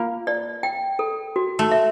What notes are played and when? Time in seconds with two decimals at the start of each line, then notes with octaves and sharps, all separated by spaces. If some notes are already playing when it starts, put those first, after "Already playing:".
Already playing: A#3 F4
0.27 D5
0.63 G5
0.99 A4
1.36 F#4
1.59 A3
1.71 E5